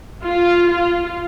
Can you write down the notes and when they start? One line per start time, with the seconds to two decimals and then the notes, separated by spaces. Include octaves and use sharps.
0.25 F4
0.68 F4